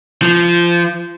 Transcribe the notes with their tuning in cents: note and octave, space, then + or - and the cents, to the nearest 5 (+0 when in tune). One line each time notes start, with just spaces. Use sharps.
F3 -20